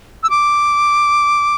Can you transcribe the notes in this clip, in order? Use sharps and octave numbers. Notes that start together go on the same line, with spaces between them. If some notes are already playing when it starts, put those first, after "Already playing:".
E6
D6